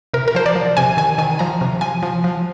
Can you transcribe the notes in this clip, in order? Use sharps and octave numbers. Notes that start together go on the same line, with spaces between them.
C3 A#4
A#4
F3 C5
D5
F3
C3 G#5
D#3 G#5
D#3 G#5
F3 A#5
C3
F3 G#5
F3
F3